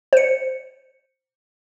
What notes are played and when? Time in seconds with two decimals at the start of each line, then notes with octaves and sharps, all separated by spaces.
0.13 C5 C#7